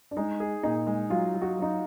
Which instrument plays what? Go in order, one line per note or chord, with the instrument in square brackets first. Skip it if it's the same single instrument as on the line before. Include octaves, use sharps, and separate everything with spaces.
[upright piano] D4
[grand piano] G#3 [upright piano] D#4
[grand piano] G#4
[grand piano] A#2 [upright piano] D#4
[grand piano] G#3
[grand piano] F#3 [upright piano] F4
[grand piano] F#3
[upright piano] F#4
[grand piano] F#3 [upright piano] D#4